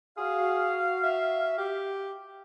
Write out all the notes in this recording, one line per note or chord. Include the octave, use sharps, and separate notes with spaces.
F#4 G#4 F5
E5
G4